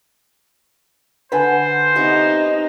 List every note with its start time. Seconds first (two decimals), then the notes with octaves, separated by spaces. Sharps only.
1.32 D3 B4 C5 F#5 G#5 A5 B5
1.96 C3 B3 D#4 C#6